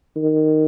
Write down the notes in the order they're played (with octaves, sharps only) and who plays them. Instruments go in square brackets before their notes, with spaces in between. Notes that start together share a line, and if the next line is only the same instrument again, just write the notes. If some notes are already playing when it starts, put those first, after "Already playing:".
[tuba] D#3